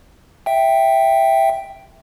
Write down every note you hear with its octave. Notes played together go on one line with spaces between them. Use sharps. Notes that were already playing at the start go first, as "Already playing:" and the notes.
E5 G5